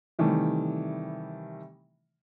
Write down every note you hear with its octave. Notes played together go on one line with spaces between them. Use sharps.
C3 D#3 E3 G3 A3